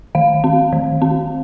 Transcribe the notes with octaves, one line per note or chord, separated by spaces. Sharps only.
D#3 F5
C4
D#3
C4